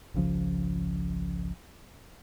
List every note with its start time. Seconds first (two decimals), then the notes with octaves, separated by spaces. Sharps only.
0.14 G#1 C#2 C#3 F3